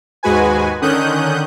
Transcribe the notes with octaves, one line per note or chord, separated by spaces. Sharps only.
D#2 G#2 G#3 F#4 B4 G#5
D3 D#3 C#4 D#6 F#6 G6